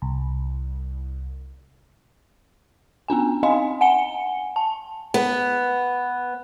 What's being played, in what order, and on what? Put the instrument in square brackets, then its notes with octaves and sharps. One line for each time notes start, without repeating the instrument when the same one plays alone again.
[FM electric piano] C2
[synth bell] B3 C#4 D4 G#5
C4 D#4 D#5 F5 G#5 C6
F#5 G#5 C#7 G7
A5
[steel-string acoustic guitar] B3